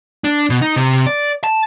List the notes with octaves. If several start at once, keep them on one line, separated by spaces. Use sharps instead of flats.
D4
B2
D#4
C3
D5
A5